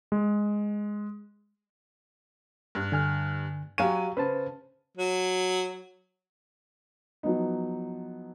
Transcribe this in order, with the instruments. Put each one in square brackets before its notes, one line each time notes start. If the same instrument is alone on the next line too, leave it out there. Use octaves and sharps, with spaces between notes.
[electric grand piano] G#3
[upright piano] G2
[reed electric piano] D3 G#5 F6
[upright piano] F#3 G#5 D#7 [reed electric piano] G4 F5 C#6
[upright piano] C#3 [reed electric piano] B4 C5 A5
[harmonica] F#3
[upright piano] F3 F#3 B3 D#4